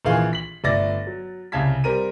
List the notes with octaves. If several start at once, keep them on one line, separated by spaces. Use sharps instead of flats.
A#1 D#3 E3 G#4 F5
B6 F#7
G1 A3 D5 A6 A#6
F#3
C2 C#3 F5 A5 G#6 B6
G3 C4 A#4 D#7